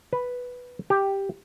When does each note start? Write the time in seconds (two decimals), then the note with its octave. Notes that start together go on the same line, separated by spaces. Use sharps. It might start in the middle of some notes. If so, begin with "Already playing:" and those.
0.13 B4
0.90 G4